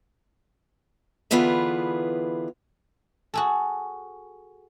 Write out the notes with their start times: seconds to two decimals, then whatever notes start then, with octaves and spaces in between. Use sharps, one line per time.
1.31 D3 E3 B3 F4 G#4 B4
3.34 F#4 G#4 A4